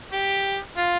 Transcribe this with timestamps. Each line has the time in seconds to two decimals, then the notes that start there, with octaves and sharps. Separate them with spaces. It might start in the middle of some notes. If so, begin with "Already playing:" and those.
0.12 G4
0.77 F4